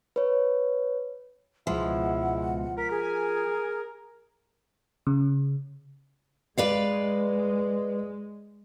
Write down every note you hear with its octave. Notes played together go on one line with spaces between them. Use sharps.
B4 C#5
C#2 B2 F3 G#3 E4 F#5
A#4 B6
G#4 G#5
C#3
G#3 B4 D5 F5